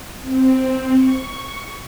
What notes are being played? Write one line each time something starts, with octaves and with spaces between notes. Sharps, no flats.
C4
C#6